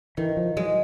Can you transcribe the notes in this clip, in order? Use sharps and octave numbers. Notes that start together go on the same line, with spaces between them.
D#3 E3
F3
F#3 G#3